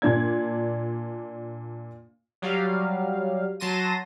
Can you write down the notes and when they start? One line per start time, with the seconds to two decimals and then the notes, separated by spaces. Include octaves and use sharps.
0.02 A#2 D4 G#6
2.42 F#3 G3 F5
3.60 F#3 A5 C6 A#6 D#7